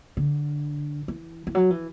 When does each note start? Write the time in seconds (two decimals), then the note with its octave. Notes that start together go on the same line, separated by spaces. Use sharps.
0.17 D3
1.08 E3
1.47 E3
1.55 F#3
1.70 E3